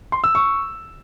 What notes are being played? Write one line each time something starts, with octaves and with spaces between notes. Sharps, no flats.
C6
E6
C#6